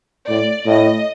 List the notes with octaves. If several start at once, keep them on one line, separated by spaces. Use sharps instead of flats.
A2 D5
A2 D#5